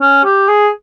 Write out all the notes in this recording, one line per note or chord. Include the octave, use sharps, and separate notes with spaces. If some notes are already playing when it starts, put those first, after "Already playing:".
C#4
G4
G#4